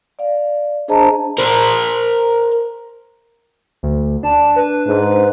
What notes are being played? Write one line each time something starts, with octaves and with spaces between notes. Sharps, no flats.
D5 F5
D4 G#4 C5 D#5 A5 A#5
A#4 C5
D2
D4 A5
B4
G#2